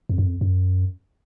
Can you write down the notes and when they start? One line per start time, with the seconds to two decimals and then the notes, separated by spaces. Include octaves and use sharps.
0.09 F2
0.18 F#2
0.26 F2
0.41 F#2